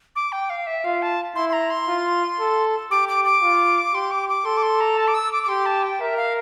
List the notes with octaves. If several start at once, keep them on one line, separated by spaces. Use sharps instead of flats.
D6
G5
F5
E5
F4 F5
A5
E4 C6
C6
A#5
C6
F4
A4
G4 D6
D6
D6
F4
G4 C6
D6
D6
A4 C6
D6
C6
A#5
A5
D6
E6
D6
D6
G4 C6
A5
G5
A#4 E5
F5